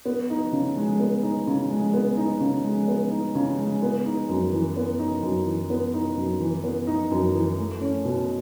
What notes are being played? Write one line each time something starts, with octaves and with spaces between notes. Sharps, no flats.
B3
D#4
C#3
G#3
B3
D#4
C#3
G#3
B3
D#4
C#3
G#3
B3
D#4
C#3
G#3
B3
D#4
F#2
E3
B3
D#4
F#2
E3
B3
D#4
F#2
E3
B3
D#4
F#2
E3
A3
C#4
B2